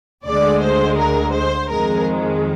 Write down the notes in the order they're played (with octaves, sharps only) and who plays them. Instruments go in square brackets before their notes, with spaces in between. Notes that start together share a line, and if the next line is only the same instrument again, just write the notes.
[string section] D2 D3 G#3 D5
C5
A#4
C5
F2 D#3 G#3 A#4